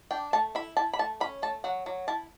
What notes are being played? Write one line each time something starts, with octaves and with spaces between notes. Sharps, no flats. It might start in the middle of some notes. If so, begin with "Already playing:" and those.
D4 G5
A3 A5
E4 B5
E4 A5
B5
A3 A5
C#4 B5
A3 A5
F#3 F#5
F#3
E4 A5